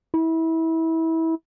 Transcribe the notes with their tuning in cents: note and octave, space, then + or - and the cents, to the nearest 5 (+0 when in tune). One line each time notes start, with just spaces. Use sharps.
E4 -25